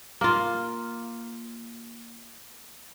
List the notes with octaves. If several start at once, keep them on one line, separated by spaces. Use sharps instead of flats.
A#3 F4